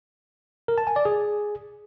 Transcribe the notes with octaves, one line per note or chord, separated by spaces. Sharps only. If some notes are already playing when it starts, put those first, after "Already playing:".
A#4
A5
G#5
D5
G#4